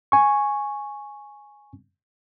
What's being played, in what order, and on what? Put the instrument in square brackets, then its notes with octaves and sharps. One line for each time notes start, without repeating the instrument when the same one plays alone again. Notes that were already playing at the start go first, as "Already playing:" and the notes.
[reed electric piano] G#5 C#6